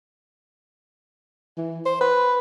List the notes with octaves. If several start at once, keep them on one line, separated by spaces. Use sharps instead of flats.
E3
C5
B4